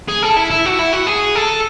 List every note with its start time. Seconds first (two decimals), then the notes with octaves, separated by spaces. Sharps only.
0.09 G#4
0.23 A4
0.37 E4
0.50 E4
0.66 F#4
0.79 E4
0.93 F#4
1.07 G#4
1.35 A4